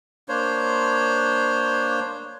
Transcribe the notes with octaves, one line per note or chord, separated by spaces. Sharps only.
A#3 D4 C5 C#5